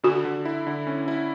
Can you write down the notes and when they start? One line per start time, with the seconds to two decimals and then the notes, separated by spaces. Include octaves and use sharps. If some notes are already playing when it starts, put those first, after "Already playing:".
0.04 D3 F#4
0.25 D3
0.45 E4
0.67 D3
0.87 C#4
1.08 E4